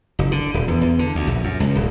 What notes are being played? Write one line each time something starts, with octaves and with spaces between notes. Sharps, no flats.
F#1
D3
D#1
E2
E2
D3
D2
A#1
F#2
C#2
D#1